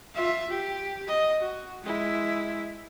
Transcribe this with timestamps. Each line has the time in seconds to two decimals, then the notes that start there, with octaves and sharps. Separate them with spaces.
0.15 F4 E5
0.50 G4
1.07 D#5
1.40 F#4
1.83 G#3 E4